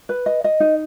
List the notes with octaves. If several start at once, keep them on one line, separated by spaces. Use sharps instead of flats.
B4
D#5
D#5
D#4